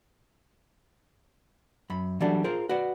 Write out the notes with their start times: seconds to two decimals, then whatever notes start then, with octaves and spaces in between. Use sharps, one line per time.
1.90 F#2 B5
2.20 E3 F#3 G3 A3 D4 F#4
2.44 F4 G#4 A#4 C5
2.69 F#4 B4 D5 F#5